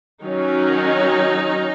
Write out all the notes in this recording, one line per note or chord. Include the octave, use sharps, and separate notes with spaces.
D#3 F#3 C#4 D#4